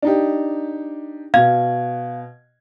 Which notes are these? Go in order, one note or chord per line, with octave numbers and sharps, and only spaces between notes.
D4 D#4 G4
B2 F5 G#6